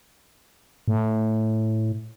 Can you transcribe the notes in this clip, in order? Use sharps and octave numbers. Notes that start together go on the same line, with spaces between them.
A2